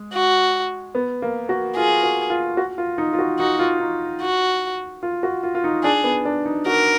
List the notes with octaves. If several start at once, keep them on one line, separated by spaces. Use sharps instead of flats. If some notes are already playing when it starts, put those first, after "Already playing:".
Already playing: G#3
F#4
B3
A#3
F#4
F4 G#4
F#4
F4
F#4
F4
D#4
F4
F#4
D#4 F#4
F4
D#4
F#4
F4
F#4
F4
F4
D#4
D4 G#4
B3
D4
D#4
F#4 A#4